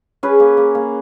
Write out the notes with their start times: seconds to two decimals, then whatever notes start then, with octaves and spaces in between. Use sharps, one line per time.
0.23 C#4 G#4 B4
0.40 A#3
0.57 A#3
0.75 A#3